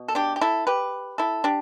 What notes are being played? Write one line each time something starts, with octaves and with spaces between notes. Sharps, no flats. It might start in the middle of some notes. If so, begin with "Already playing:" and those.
Already playing: B2
A4
D4 G4
G4
E4 A4
G4 B4
E4 A4
D4 G4